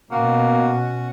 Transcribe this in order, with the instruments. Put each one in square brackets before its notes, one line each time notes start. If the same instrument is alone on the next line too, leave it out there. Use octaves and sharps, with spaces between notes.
[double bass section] B2 [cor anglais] A#3 [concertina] C#4 F#4 F#5